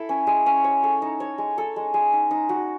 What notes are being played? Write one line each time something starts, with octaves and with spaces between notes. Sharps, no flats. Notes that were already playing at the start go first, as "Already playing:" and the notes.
Already playing: E4 A4
C#4
G#3
C#4
C#5
A4
D#4
C#5
G#3
A4
G#3
G#3
D#4
D#4
F#4